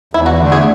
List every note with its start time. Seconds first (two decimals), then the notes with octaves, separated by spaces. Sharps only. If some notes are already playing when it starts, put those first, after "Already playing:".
0.14 E2 E4
0.26 F#4
0.39 D3 A3
0.52 G#4